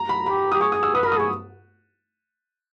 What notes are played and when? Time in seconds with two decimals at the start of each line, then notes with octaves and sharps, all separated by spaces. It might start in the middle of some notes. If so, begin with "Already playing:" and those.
Already playing: A#5
0.09 B5
0.26 G4 B5
0.52 G4 D#6
0.61 G#4 C#6
0.72 D#6
0.83 E6
0.95 B4 D#6
1.03 A#4 B5
1.12 D#6
1.17 G#4 C#6